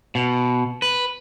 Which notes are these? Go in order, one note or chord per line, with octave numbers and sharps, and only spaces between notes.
B2
B4